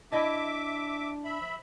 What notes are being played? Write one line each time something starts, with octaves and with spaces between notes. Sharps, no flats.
D4 E4 D#5 E5 A5 D6
E5 B5
F3